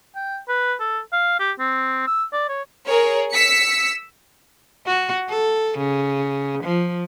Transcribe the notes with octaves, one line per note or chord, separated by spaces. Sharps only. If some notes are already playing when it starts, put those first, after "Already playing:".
G5
B4
A4
F5
G4
C4
E6
D5
C#5
G#4 A#4 C#5
E6 B6 C#7
F#4
A4
C#3
F3